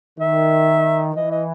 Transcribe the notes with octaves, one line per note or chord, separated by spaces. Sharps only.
D#3 E5
E3 D#5
D#5